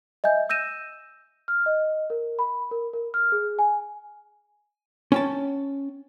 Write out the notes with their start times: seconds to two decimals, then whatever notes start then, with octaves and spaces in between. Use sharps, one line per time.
0.24 D#5 E5 G#5 G6
0.49 E6 G6 A#6 D#7 E7
1.48 F6
1.66 D#5
2.10 A#4
2.39 B5
2.71 A#4
2.93 A#4
3.14 F6
3.32 G#4
3.59 G#5
5.12 C#4 G5 A5